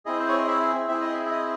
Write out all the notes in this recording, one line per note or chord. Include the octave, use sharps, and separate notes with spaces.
C4 E4 G#4 D#5
C5
C#5
D#5
E5
C4 E4 G#4 E5
D#5
E5
E5
D#5